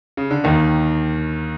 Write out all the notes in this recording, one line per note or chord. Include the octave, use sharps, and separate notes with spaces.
C#3
D3
D#2 D#3